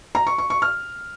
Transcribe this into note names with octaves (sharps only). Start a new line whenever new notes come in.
A#5
C#6
C#6
C#6
F6